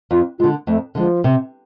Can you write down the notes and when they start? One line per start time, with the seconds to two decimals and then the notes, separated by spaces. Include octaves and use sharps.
0.11 F2 F4
0.39 D3 G#3 F4
0.67 F2 A3
0.95 D3 F3 G#3
1.24 C3